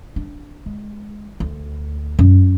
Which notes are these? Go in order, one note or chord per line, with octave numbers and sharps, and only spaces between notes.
D4
G#3
D2
F#2